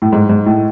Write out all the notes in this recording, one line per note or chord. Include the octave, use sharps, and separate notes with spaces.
A2
G#2
G#2
A2